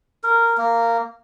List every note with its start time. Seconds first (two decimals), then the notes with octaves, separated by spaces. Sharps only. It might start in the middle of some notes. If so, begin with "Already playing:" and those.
0.24 A#4
0.58 A#3